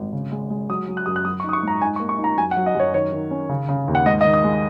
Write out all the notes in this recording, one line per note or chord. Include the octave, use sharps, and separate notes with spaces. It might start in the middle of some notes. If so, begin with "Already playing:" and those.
Already playing: G#1
C#3
G#3
G#3
F#3 D#6
F#3
F#6
F#2 D#6
F#6
F#3 D#6
C#6
D#4
D#6
C#6
G#2 A#5
D#4 G#5
C#6
A#3
C#6
D#4
A#5
F#2 G#5
F#5
F#3
D#5
F#2 C#5
D#3 C#5
D#3
C#4
C#3
C#3
D#2
F#5
G#2 D#5
D#5
D#3
D#6
G#3